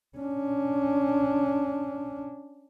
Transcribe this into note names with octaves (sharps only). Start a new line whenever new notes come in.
C#4 D4